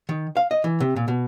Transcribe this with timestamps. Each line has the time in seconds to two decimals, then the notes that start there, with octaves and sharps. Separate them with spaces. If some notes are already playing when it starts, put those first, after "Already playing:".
0.09 D#3
0.37 F5
0.51 D#5
0.64 E3
0.80 C3
0.96 A#2
1.08 B2